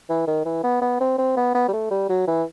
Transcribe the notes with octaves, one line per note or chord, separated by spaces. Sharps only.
E3
D#3
E3
B3
B3
C4
C4
B3
B3
G3
A3
G3
F#3
E3